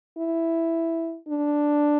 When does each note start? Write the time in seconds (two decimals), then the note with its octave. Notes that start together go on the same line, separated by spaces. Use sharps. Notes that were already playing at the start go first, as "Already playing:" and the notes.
0.17 E4
1.28 D4